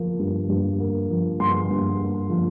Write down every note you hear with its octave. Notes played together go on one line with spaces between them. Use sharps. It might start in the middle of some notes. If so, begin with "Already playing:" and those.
Already playing: F3 A#3
G2
G2
A#3
F3
G2 C6
G2
A#3
F3